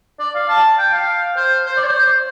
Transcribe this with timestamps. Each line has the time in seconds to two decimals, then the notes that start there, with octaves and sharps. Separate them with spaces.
0.19 D5
0.35 F5
0.49 A5
0.78 G5
0.93 F5
1.37 C5
1.66 C5
1.77 D5
1.86 C5